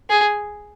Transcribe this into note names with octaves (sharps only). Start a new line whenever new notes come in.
G#4